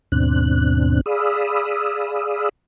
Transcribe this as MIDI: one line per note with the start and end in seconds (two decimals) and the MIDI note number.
0.12 1.01 39
0.12 1.01 44
0.12 1.01 47
0.12 1.01 60
0.12 1.01 62
0.12 1.01 90
1.06 2.49 68
1.06 2.49 74
1.06 2.49 77
1.06 2.49 83
1.06 2.49 87
1.06 2.49 88